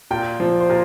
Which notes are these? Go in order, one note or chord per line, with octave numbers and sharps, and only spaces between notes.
A#2 G5
F3
C5
A#2